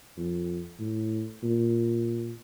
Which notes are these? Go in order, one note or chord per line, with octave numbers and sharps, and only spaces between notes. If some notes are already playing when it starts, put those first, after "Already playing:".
F2
A2
A#2